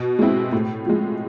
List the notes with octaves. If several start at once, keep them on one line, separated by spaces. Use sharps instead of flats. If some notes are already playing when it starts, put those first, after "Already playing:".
Already playing: B2
G#3 C4 E4
A2
F3 G#3